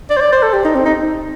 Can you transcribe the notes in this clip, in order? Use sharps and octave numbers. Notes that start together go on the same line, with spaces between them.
D5
C5
D5
C5
A4
G4
D#4
C4
D#4